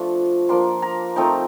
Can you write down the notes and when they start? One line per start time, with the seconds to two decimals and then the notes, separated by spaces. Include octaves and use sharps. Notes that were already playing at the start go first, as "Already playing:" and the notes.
Already playing: F3 A3 D4 F4
0.49 F3 A#3 D4 C6
0.82 A#5
1.16 F3 A3 C4 D#4